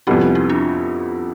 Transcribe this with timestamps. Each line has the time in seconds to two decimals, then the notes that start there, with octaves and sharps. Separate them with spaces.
0.07 F2 C3 G3 B3 C4 E4
0.21 C4
0.35 C4 E4
0.50 D4 F4